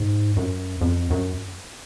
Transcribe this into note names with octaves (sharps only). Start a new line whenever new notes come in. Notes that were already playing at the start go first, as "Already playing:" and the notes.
Already playing: G#2
F#2
F2
F#2